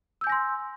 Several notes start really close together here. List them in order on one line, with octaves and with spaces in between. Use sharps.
E6 G6 G#5 A#6 C6